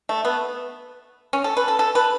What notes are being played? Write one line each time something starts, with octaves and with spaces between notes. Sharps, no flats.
A3
B3
C#4
A4
B4
A4
A4
B4